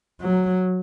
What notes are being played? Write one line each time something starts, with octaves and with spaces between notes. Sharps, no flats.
F#3